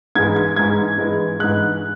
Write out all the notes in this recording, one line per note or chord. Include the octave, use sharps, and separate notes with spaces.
G#2 E3 G#3 G#6
G#6
G#2 E3 G#3 G#6
G#2 E3 G#3
G#2 E3 G#3 F#6